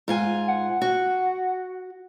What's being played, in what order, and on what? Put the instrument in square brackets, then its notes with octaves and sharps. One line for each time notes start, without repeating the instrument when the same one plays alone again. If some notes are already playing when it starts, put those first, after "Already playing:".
[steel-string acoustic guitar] G#2 F4 G#5
[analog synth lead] F#5
[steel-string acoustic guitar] F#4